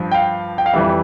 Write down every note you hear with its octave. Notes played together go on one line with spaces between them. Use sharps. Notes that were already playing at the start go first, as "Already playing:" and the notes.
Already playing: G2 F3
G5
F5
G5
F5
F2 E3 G3 E5